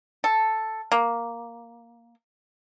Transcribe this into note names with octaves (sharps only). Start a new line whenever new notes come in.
A4
A#3